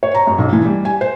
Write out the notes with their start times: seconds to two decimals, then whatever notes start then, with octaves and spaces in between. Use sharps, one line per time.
0.03 C#5
0.15 A#5
0.27 F#2
0.38 B1
0.53 E3
0.65 G3
0.85 G#5
1.01 C5